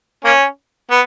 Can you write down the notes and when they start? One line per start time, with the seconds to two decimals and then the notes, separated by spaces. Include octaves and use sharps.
0.24 A#3 C#4
0.91 B3